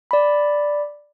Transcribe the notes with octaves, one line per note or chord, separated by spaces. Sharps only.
D5 B5